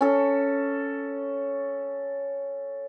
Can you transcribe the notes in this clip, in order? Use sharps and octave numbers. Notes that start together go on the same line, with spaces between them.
C#4 A4